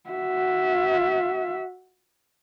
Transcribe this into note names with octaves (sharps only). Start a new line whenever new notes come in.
F#4 E5